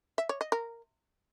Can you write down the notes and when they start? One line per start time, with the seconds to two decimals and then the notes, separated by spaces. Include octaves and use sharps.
0.18 E5
0.29 C#5
0.41 D#5
0.52 A#4